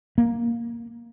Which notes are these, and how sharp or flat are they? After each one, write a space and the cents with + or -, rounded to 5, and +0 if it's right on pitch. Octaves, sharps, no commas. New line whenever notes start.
A#3 +5